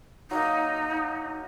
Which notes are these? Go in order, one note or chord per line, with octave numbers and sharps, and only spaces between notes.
F#3 A#3 D#4